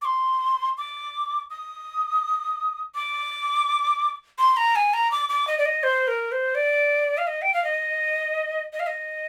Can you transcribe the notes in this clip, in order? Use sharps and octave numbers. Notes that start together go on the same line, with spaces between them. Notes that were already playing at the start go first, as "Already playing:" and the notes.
D6
C6
D6
D#6
D6
C6
A#5
G#5
A#5
D6
D6
D#5
D5
D#5
C5
A#4
C5
D5
F5
D#5
G5
F5
D#5
D#5
F5
D#5